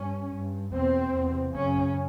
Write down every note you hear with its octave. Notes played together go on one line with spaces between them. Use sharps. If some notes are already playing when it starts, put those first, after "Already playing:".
Already playing: G2 C#4
G2
E2 B2 C4
E2
C3
F#2 C#3 C#4